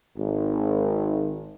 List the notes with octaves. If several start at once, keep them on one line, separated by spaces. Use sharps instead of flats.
G#1